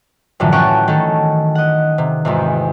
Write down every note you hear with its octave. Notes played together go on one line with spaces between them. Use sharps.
F#2 A2 D3 E3 F3
C#4 A4 F#5 G5 C#6 D7
D#3 A3 C#4 A4
D#5 F#5
C3
G#1 E2 C3